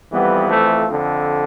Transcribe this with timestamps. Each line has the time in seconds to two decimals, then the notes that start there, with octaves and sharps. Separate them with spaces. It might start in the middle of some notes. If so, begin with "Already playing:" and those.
0.12 F2 E3 G3 B3
0.50 F3 A3
0.87 F2 D3